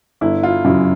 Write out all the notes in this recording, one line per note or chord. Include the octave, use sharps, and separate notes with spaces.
G1 E4
F4
F#2 C#3 E4